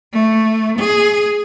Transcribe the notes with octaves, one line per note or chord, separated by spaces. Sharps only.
A3
G#4